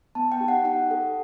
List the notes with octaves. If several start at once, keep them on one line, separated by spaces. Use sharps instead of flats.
B3 A5
G5
D#4 G4
F#5
D#4 F#5
A4